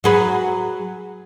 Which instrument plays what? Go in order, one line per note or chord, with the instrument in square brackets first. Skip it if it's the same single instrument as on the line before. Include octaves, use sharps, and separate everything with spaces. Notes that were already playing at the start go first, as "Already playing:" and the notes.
[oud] F#3 G#4 B4